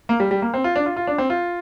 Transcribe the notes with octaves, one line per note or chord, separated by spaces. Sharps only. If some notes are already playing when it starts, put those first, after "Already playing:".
A#3
G3
G3
A#3
C4
F4
D4
F4
F4
D4
C4
F4